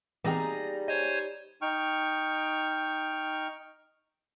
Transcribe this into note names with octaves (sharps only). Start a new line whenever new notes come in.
E3 G3 A#3 C4 D#4 G#4 A#5 A#6
C5 C#5 D#5 G#5
D#4 G5 C#6 F6